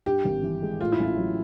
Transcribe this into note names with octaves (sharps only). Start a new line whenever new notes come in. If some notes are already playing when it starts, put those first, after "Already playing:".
G2 G4
G#1
E3
G#3
A2 F4
E4
A1 F4
F#3